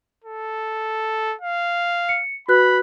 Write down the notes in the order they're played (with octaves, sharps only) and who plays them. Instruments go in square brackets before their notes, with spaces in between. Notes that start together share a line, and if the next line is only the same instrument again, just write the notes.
[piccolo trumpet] A4
F5
[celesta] C#7
[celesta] F#4 B4 F#6 [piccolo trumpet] B5